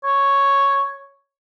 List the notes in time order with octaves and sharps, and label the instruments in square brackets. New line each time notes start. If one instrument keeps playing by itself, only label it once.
[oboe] C#5